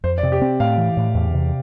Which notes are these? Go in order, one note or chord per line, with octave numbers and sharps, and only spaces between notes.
F2 C5
D5
C3
G4
C4
A2 F5
E3
A2
E2
C3